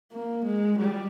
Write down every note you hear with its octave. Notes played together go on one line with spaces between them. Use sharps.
A#3
G#3
G3